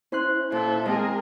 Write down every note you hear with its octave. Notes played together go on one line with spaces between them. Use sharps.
C#4 E4 C5 C6 F#6
A#2 A4 E5
G#3 C4 G#4 A#4